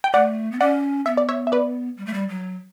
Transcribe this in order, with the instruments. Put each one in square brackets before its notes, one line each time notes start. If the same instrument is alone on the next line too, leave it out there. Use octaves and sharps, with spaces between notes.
[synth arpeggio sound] G5
[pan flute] A3 [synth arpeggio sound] D5 F#5
[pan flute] B3
[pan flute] C#4 [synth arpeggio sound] D5 F#5
[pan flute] B3 [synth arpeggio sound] E5
[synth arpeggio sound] D5
C#5 E5
E5
B4 D5
[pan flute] G3
A3
G3
F#3